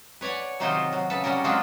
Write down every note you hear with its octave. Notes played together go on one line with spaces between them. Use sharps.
B4 C#5 D5 F#5 G#5
C3 D#3 F#3 D#4 F4 C5
F#3
C#3 A4 B4
C3 F#3 G3 C#4 A#4
F#3 G#3 A#3 C4 D4 F4